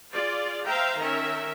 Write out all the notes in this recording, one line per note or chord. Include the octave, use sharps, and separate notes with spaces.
F4 G#4 D5
C5 E5 F5 G5 A#5
D#3 C#4 A#4 E5